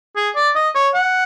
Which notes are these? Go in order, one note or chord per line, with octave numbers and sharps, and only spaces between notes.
G#4
D5
D#5
C#5
F#5